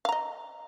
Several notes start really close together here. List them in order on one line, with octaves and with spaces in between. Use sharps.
F5 A#5 D#5